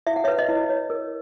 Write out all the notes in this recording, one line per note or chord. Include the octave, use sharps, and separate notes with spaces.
E4 E5
F#5
C#5 E5
B4
D#5
E4
C#5
A#4